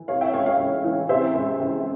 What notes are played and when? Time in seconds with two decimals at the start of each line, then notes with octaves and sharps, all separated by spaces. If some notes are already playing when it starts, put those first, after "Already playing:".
Already playing: E3
0.08 C3 C#5 F5
0.21 E5 G5
0.33 C#2 C#5 F5
0.46 C#5 F5
0.59 C#2
0.84 E3
1.09 C3 C5 E5
1.34 C#2
1.59 C#2